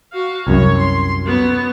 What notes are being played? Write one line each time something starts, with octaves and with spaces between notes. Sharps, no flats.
F#4 F5
C2 F#2 C#5
C6
F#3 B3